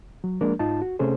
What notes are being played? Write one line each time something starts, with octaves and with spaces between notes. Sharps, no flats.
F#3
F3 G#3 A#3 D4 A#4
G#2 D#4 F4 A5
F#4
C3 A3 C#4 G#4 A4 C5